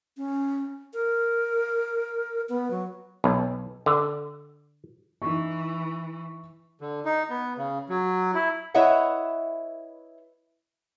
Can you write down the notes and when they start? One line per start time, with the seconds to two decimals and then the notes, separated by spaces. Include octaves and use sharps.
0.17 C#4
0.93 A#4
2.49 B3
2.71 F#3
3.24 B1
3.86 D3
5.22 E3 D#4 C#6
6.81 D3
7.05 D#4
7.30 B3
7.58 C#3
7.89 F#3
8.35 E4
8.74 E4 B4 C#5 D#5 E5 F#5